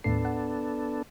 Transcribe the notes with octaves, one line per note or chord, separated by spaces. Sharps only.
D#2 A2 B3 D4 A4 C7
F#5